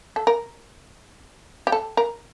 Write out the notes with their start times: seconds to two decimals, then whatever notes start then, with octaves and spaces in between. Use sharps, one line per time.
0.16 A4
0.27 A#4
1.67 G4
1.72 A4
1.97 A#4